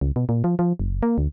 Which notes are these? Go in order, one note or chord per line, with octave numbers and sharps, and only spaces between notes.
C#2
B2
A#2
F3
F3
F#1
A#3
D2